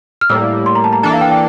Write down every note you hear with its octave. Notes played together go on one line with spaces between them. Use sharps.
F6
A2 G3 A#3 E6
C6
A#5
A5
A#5
E3 A#3 D4 A4 A5
F5
G5
G5